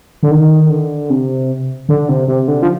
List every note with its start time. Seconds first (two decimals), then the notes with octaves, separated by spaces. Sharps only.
0.23 D3
0.31 D#3
0.70 D3
1.10 C3
1.89 D3
2.09 C3
2.28 C3
2.48 D3
2.62 F3